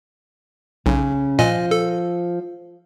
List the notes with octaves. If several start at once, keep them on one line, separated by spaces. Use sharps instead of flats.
B1 C#3
A#2 F3 D#5 G#5
A4